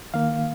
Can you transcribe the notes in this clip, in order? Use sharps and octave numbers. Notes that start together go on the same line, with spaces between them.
D#3 A#3 F5